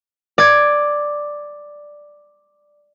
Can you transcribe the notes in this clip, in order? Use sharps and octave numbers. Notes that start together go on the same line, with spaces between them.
D5 G#6